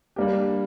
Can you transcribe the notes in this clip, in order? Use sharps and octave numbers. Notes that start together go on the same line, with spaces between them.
G3 A#3 D4 G4